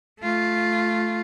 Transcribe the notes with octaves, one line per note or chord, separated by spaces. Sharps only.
A3 F4